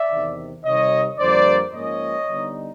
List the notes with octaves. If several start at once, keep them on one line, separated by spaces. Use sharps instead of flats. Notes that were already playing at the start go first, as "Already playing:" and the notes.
Already playing: D5 E5
E2 C3 D#3
C3 D#3 G3 C#5 D#5
F2 D3 G3 A#3 C5 D5
G#2 F3 A#3 C#4 C#5 D#5
D3 G3 B3 D#4